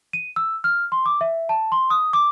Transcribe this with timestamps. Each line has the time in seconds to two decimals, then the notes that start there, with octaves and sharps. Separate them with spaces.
0.13 D#7
0.36 E6
0.64 F6
0.92 C6
1.06 D6
1.21 E5
1.49 A5
1.72 C6
1.90 D#6
2.13 D6